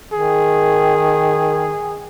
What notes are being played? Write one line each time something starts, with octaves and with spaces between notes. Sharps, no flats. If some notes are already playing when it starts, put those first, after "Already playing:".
D#3 G#4